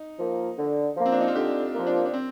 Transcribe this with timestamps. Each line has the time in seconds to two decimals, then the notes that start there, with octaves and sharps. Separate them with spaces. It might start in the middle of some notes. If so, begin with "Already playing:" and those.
Already playing: D#4
0.19 F3 A#3
0.58 D3
0.97 F3 A#3
1.06 C4
1.12 D4
1.21 D#4
1.28 F4
1.35 D3 G4
1.75 F3 A#3
1.87 D4
2.06 D4
2.14 C4